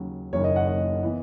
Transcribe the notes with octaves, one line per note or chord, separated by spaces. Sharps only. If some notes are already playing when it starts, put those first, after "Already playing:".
Already playing: D#2 C#3 F#3
F#1 F#2 D#3 A#3 C#5
D#5
F#5
D#5
E3 B3